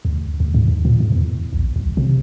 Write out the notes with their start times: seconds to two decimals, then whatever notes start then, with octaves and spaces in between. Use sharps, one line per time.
0.05 D2
0.40 D2
0.54 G#2
0.68 D#2
0.85 A#2
1.00 G#2
1.12 E2
1.53 A#1
1.76 C2
1.97 C3